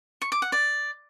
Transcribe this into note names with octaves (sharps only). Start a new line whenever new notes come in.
C#6
D6
F#5
D5